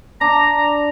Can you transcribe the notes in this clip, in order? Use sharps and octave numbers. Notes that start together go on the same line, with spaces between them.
D4 A#5